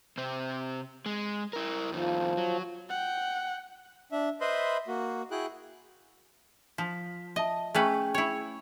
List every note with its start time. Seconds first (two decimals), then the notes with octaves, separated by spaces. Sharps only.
0.18 C3 C4
1.06 G#3
1.53 E4 A#4
1.92 F2 D#3 F3
2.37 F#3
2.89 F#5 G5
4.12 D4 E5
4.41 B4 C5 D#5 E5 B5 C6
4.87 A#3 F#4
5.31 E4 F#4 G#4 G5 F#6
6.78 F3 B6
7.36 D#5 E5 A5
7.74 A3 C#4 G#4 B4 G5 G6
8.14 E4 C#5